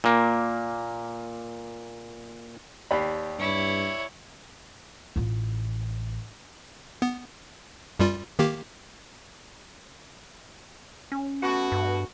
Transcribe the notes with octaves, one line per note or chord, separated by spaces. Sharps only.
A#2 A#3
D#2 G4 D5 B5 C7
G2 E4 C#5
A1 F4
B3
F#2 G3 F4
D#3 A#3 G4
C#4
B2 A3 F#4
G2